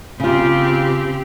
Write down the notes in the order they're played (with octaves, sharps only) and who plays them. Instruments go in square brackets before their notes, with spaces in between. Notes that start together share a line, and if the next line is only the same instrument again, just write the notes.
[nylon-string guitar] C#3 F4 [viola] C4 G4